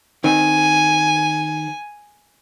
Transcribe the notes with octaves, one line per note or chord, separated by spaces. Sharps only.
D#3 C4 G#5